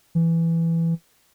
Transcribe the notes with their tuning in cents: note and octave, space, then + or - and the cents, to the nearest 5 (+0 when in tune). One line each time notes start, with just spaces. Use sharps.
E3 +10